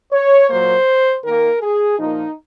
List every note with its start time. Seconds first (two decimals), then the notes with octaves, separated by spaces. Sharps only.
0.12 C#5
0.49 A#2 F#3 A#3 C5
1.24 D#3 A#3 A#4
1.61 G#4
1.99 A#2 F3 A#3 D#4